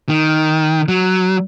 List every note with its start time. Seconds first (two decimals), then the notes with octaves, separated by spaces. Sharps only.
0.09 D#3
0.88 F#3